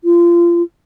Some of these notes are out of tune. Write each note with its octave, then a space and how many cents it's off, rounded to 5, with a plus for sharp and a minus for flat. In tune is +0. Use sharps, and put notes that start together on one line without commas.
F4 -25